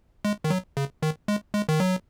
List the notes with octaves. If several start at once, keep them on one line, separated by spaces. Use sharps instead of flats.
G#3
D#3
F#3
C#3
D#3
G#3
G#3
D#3
F#3